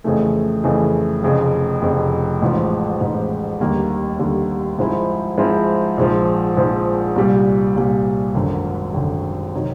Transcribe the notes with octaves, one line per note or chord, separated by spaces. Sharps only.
F2 C#3 E3 A3
F2 C#3 E3 A3
F1 F2 C#3
F1 F2 C#3
A1 G#2 F3
A1 G#2 F3
D#2 D3 G3 A#3
D#2 D3 G3 A#3
G#2 F3 G#3 C4 E4
G#2 F3 G#3 C4 E4
A#1 G#2 F3
A#1 G#2 F3
C2 A#2 G3
C2 A#2 G3
G#1 F#2 D3
G#1 F#2 D3
C3 D#3 F#3